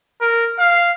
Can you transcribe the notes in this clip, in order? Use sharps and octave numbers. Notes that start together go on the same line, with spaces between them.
A#4
F5